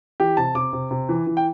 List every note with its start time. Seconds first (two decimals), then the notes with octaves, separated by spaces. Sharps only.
0.20 E3 G4
0.37 C3 A5
0.55 C3 D6
0.73 C3
0.91 C3
1.09 E3
1.27 E3
1.37 G5